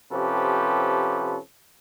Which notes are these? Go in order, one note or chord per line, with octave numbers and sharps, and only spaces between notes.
C3 F3 C#4 G4 A4 B4